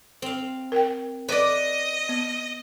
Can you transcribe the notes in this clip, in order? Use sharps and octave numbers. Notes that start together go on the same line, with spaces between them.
C4 F5
A#4 G5
B4 D5 D#5
B3